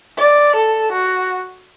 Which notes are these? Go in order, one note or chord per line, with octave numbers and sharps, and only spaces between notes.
D5
A4
F#4